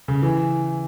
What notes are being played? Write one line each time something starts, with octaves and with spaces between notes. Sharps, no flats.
C#3
E3